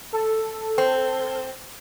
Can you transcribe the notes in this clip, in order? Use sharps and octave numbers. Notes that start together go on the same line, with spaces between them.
A4
C4